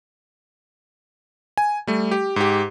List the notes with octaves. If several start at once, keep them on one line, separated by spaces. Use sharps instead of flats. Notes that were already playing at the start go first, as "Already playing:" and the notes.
G#5
G3 A3
G4
G#2 G4